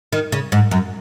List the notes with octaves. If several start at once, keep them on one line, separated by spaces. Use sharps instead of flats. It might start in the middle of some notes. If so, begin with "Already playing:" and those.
D#3
C#3
G#2
F#2